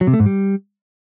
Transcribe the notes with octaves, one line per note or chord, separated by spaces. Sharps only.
F#3
C3
A3
G#2
G3